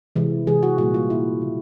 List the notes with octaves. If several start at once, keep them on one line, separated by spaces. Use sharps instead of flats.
C3 E3 G#3
C3 E3 G#3 G#4
F#4
A#2 G3 A#3 F#4
F4
A#2 G3 A#3 E4
C#3 F#3 A#3